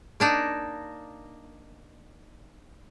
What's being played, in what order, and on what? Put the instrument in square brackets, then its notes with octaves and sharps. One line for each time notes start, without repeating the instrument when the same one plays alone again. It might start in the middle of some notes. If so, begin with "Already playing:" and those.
[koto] A#3 D4 D#4